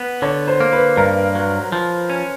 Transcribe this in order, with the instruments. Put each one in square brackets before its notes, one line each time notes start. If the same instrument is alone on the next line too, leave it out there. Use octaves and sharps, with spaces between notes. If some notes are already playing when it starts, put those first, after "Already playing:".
Already playing: [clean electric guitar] B3
[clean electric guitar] D3 [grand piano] C#5
[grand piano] C5
[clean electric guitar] A#3
[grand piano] B4
[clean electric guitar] G2 [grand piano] A#4
[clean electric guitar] F#3
F3
C#4